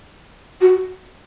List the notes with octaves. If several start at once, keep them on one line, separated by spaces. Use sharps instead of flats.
F#4